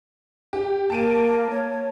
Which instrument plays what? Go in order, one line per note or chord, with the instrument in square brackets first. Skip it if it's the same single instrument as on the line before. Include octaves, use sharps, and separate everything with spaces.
[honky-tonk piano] G4
[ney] A#3 [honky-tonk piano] A5 D7 D#7
[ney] C#5